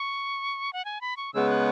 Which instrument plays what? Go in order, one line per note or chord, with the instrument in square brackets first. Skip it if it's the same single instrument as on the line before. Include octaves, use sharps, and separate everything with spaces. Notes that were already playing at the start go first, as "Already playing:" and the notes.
Already playing: [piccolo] C#6
F#5
G#5
B5
C#6
[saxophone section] C#3 G#3 B3 [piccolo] E6
[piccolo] F#6